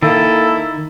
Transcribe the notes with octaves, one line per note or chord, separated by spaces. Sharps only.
D#3 A#3 E4 A4